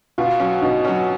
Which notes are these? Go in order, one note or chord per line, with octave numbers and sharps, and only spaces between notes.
B2 F4
F#3 C#4
B2 D#4
F#3 C#4